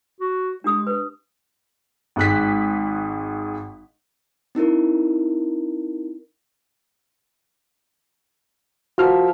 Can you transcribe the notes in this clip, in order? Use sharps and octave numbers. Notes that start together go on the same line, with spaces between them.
F#4
G#3 D4 G4 D#6
B4
G#1 G#2 F#6 B6
C4 D#4 E4 A#4
F3 F#4 A#4 E5 F6